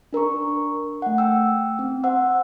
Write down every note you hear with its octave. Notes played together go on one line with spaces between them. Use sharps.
D4 A#4 A#5 C#6
A3 F#5
G5 E6
C4
C5 F#5 E6